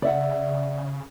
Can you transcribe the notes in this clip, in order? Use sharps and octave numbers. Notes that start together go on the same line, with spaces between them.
C#3 D5 E5 F#5